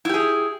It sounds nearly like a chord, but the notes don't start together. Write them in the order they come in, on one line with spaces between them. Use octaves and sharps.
E4 G4 G#4